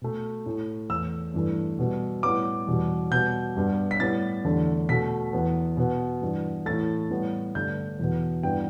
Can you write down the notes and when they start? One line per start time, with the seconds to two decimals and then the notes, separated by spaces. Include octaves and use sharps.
0.02 B2 A3
0.46 A2 A3
0.90 E2 E3 A3 E6
1.34 G2 E3 A3
1.79 B2 G3 B3
2.23 A2 G3 B3 D6
2.67 E2 B2 G3
3.11 B2 G3 B3 G6
3.56 G2 G3 B3
3.91 B6
4.00 A2 G3 B3 A6
4.45 E2 D3 A3
4.89 B2 A3 B6
5.33 E2 E3 B3
5.77 B2 B3
6.22 G2 E3 B3
6.66 A2 E3 A3 A6
7.10 A2 G3 B3
7.55 G2 D3 A3 G6
7.99 E2 B2 B3
8.43 G2 E3 B3 G5